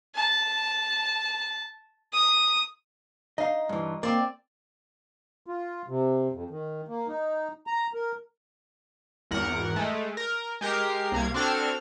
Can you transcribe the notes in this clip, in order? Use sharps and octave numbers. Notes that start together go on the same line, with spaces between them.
A5
D#6
D#4 D#5 F5
G2 E3
A#3 C4 D5
F4
C3
F2
D#3
A#3
D#4
A#5
A#4
G#1 E2 A#4 F#5
G#3 A3
A#4
G#3 G4 A#4 C7
C2 A#3 G#6
C4 D4 F#4 A4 F6 G#6